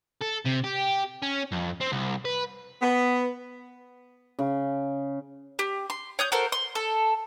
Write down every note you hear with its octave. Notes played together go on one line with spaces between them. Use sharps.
A4
C3
G4
C#4
F2
C4
C2
B4
B3
C#3
G4
C6
C#5 D#6 G6
F#4 A4 A#4 C5
C6
A4